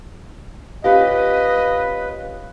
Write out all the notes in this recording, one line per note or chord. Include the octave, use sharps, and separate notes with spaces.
C#4 F4 G4 B4 D#5 F5